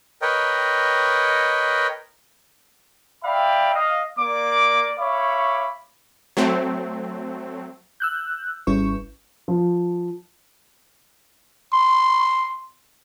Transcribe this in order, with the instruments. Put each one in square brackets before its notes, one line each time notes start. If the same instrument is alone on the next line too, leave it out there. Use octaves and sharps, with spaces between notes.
[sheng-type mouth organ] A#4 B4 C#5 D#5 G5
[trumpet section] D5 E5 F5 G5 B5
D#5 F5
A#3 D5 D6
C#5 E5 F5 B5 C#6 D6
[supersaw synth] F#3 A3 C4
[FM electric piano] E6 F#6 G6
G#1 G3 C#4 E4 B4 C#6
[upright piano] F3
[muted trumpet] C6